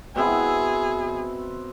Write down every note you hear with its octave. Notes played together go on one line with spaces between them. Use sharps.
B2 C4 E4 G#4